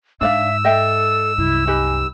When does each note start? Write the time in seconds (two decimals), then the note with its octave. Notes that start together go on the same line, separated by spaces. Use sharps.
0.21 G#2 D4 D5 E5 F5 E6
0.64 A4 D#5 E5 G5
1.38 C2 F#2 E4
1.67 D#4 G4 B4 G#5